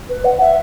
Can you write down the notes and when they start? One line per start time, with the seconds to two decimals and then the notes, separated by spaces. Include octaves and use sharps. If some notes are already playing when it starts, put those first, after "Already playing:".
0.09 B4
0.24 F#5
0.41 E5